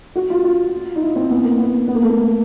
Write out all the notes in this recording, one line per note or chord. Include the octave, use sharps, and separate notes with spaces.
F#4
F4
F4
D#4
E4
C4
B3
A#3
B3
B3
A#3
A3
A#3